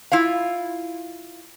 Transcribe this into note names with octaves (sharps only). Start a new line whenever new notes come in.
E4 F4 F5